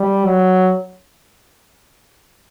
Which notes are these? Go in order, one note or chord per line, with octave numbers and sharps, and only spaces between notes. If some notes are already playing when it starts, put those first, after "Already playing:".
Already playing: G3
F#3